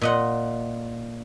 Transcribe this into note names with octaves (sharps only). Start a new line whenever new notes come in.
A#2 D#5 F#5